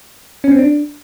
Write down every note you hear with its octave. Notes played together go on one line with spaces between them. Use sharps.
C#4
C4
D4